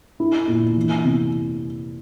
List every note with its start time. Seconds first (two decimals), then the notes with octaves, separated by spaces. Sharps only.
0.20 E4
0.48 A#2
0.77 E3
1.04 C3